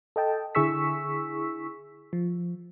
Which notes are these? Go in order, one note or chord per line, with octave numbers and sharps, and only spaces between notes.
A4 D#5 G5 A5
D3 E4 G#4 C#6 E6 B6
F3